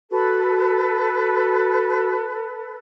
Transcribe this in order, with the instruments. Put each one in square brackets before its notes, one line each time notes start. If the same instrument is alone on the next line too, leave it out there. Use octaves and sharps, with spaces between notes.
[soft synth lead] F#4 [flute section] A4 B4